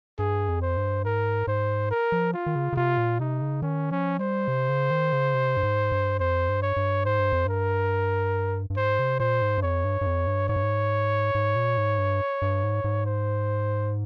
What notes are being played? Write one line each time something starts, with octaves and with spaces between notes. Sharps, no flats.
G2 G#4
F2
C5
G2
G#2 A#4
G#2 C5
A#4
F3
F4
D#3
C#3
C#3
C3 F4
A#2
C3 D#4
C#3
D#3 C#4
F3 C#4
G3 C5
C3
C#3
D#3
C#3
C3
G2
G#2
G2
F2 C5
G2
C#5
G2
G#2 C5
G2
F2
G2 A#4
G2
G#2 C5
C3
A#2 C5
G#2
G2
F2 C#5
G2
G2
F2
G2
G#2 C#5
G2
G#2
G#2
A#2
G#2
G2
G2
G#2
G#2
C5